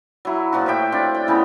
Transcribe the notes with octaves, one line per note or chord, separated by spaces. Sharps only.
F#3 E4
A#2 F3 F4 F#4
A2 C#5 E5 G5
C4 D4 F4
G5
A2 C#3 E3 B3